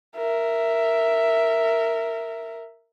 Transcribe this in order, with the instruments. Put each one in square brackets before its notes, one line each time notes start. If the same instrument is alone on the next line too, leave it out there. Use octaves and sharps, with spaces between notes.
[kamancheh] A#4 E5